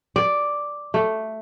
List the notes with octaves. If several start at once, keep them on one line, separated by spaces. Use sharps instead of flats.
D5
A3